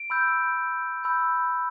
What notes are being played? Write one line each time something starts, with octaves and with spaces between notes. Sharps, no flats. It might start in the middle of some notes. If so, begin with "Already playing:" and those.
Already playing: D7
B5 E6 G6
B5 E6 G6